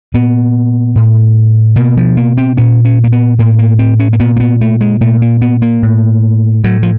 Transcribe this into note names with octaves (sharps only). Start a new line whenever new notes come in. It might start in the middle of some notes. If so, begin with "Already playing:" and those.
A#2 B3
A2
B2 A#3
F3
A#3
C4
A#2 C#4
C#4
A#3
B3
A2 A#3
A#3
C4
C#4
A#3
A#2 B3
A#3
B3
A3
G#3
A#2 A3
A#3
B3
A#3
A2
A2 F#3
F3